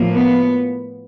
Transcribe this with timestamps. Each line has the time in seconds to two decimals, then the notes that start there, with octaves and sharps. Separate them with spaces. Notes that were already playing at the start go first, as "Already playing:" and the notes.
Already playing: A2 F3 A#3
0.12 B3